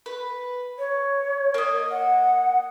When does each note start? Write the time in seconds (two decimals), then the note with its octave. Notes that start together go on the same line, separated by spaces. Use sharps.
0.06 B4
0.79 C#5
1.54 A#3 D#5
1.91 F#5